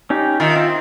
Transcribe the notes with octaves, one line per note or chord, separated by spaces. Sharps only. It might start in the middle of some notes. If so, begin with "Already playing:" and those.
C#4 D#4 G4
D#3 F4 E5
C4